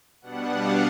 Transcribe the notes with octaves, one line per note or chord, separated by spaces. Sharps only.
B2 G3 B3 D4 F#5
F5